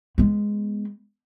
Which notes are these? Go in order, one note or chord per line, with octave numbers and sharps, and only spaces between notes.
G#3 B3